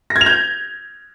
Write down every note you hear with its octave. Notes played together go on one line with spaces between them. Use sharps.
A#6
G#6
F7
G6